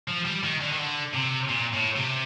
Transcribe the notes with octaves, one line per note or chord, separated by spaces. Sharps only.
F3
G3
D#3
D3
D#3
D3
C3
A#2
A2
C3